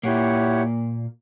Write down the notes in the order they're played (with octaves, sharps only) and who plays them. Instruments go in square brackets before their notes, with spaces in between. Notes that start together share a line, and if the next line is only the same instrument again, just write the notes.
[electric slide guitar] A#2 A#3 [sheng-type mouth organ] E4 G4 C#5 F#5